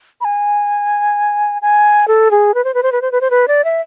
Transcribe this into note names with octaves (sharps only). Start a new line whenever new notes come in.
B5
G#5
G#5
A4
G#4
B4
C5
B4
C5
B4
C5
B4
C5
B4
D5
E5